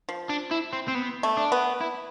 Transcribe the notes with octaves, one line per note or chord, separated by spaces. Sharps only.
F3
D4
E4
C4
C4
B3
A3
D4
B3
E4